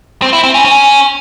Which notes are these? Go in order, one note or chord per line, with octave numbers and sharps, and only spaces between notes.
C4
E4
C4
C#4
C#4